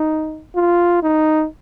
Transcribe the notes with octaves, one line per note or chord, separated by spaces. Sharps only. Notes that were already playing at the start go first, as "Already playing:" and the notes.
Already playing: D#4
F4
D#4